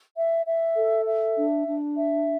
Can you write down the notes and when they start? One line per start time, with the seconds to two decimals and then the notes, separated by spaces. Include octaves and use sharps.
0.16 E5
0.46 E5
0.76 A4
1.06 E5
1.36 D4
1.65 D4
1.96 E5